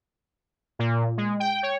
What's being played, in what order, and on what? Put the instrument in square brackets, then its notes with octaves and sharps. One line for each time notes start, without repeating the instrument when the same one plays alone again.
[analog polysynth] A#2
G#3
G5
C#5